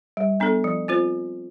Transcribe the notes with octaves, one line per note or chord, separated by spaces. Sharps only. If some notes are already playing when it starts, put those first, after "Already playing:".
G3
B3 D4 A4
F3
C4 F4 C5